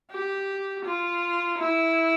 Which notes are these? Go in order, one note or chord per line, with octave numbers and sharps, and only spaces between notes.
G4
F4
E4